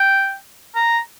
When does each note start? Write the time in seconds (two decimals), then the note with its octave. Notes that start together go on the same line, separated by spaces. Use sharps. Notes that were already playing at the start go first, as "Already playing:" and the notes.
Already playing: G5
0.75 A#5